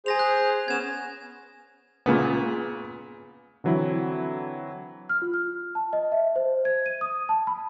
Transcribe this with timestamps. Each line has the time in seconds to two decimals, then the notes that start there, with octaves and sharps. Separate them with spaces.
0.06 G#4 C5 G#5 A#6 F7
0.19 F#6
0.68 B3 C#4 G#6 E7
2.06 A#2 C#3 B3
3.64 D3 E3 F#3 C4 E4
5.09 F6
5.22 F4
5.34 F6
5.75 A5
5.93 D#5
6.12 E5
6.36 C5
6.65 G#6
6.86 D#7
7.01 D#6
7.29 A5
7.47 B5